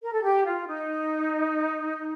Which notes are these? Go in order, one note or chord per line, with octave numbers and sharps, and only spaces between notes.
A#4
A4
G4
F4
D#4